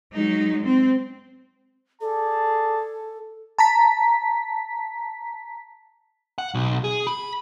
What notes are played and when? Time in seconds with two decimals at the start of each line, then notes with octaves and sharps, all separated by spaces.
0.14 F#3 G#3 D#4
0.65 C4
2.01 G#4 A4 D5 A5
3.59 A5 A#5 B6
6.38 F#5
6.54 B1
6.84 G#4
7.07 B5